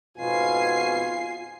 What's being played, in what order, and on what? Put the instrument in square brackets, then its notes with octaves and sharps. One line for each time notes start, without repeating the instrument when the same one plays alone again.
[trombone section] F2 G#2 B2 [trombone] F4 [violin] G#5 C7